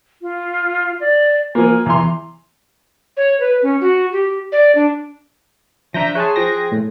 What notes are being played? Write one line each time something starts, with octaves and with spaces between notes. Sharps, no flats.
F4
D5
F3 A#3 G#5
E2 A#5 C6
C#5
B4
C#4
F#4
G4
D5
D4
F3 D4 E5 A#5 G6 A#6
G#4 C#5 G#5 A5 C6 F#6
F3 G5 A#6
A2